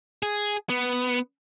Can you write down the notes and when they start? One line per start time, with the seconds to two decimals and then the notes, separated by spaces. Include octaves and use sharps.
0.23 G#4
0.70 B3